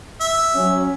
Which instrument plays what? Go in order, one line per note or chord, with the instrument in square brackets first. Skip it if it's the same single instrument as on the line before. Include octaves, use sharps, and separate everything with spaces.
[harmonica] E5
[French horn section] F#3 C#4